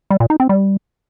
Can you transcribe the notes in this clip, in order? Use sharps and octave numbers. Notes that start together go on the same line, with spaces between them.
G3
A#2
D#4
C4
G3